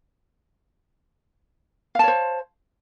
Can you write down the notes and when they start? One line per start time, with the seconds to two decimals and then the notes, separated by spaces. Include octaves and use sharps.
1.95 F5
1.99 A5
2.03 C#5
2.08 C5